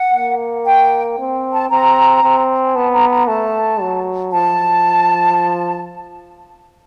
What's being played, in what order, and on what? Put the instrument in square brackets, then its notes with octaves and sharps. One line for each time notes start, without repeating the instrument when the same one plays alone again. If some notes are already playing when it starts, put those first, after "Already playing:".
Already playing: [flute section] F#5
[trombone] A#3
[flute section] G5
[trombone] C4
[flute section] A5
[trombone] C4 [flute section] A#5
[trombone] C4
[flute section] G#5
[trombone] B3 [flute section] A5
[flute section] A#5
A#5
[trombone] A3 [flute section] A5
[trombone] F#3
[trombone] F3 [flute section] A5